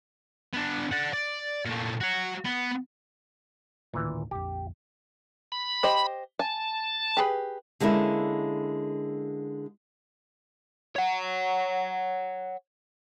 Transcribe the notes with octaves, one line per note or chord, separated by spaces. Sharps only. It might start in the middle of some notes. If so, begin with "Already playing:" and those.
B3 D4
D5 F#5
D5
A#2 A3
F#4 C#5
B3
A1 D2 A#2 D#3 E3
A#1 F2 G4
B5
G4 C5 D#5
G#5 A5
G4 G#4 B4
D3 G#3 A#3 C#4 E4
C#5 F#5